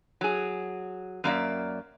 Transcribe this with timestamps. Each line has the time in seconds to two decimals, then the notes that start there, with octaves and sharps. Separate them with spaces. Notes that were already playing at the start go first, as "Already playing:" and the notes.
0.21 F#3 G#4
1.24 F#2 A#3 D5 E5